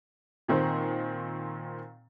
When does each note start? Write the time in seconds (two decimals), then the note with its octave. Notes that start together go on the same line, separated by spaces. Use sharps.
0.48 A#2 D#3 C4